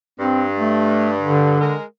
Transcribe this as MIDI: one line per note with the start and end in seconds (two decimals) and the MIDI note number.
0.20 1.59 43
0.20 0.45 60
0.58 1.12 57
1.21 1.74 50
1.61 1.84 56
1.61 1.84 70